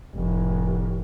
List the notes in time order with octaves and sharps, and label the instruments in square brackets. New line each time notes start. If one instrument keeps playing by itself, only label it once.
[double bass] F1 A2